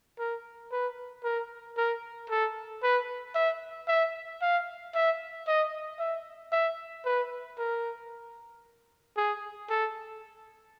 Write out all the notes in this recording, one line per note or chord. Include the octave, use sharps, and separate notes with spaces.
A#4
B4
A#4
A#4
A4
B4
E5
E5
F5
E5
D#5
E5
E5
B4
A#4
G#4
A4